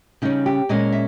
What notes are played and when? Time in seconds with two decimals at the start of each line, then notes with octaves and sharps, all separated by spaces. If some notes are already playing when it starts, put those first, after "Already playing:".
0.22 C#3 G3 C#4 D#4
0.46 G4
0.69 A#2 G#3 C#4 D#5
0.92 E5